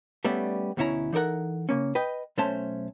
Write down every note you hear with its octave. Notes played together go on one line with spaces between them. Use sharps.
G3 A3 B3 C#4 D5 E5
D2 B2 C#4 E4 A#5
E3 D#4 A4 A#4 F#5
C#3 A#3 C#4
B4 D#5 G5
B1 A3 C#4 C5 E5 A5